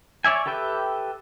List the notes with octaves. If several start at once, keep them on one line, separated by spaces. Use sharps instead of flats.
C#5 D5 E5 G#5
G4 A4 B4 E5 G5